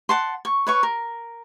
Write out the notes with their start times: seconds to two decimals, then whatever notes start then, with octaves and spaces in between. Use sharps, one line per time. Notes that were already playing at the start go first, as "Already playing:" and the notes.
0.09 F#5 A5 C6
0.45 C#6
0.67 B4 C#5 C#6
0.83 A#4